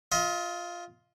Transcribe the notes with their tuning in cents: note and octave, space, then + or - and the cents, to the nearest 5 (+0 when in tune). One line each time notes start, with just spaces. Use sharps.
F4 +0 D#5 +40